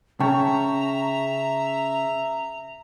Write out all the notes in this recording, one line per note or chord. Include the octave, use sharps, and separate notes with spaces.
C#3 E5 G5 A5 A#5 C#6